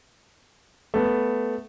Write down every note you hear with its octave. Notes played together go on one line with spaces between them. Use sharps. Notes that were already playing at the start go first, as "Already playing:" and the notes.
A3 B3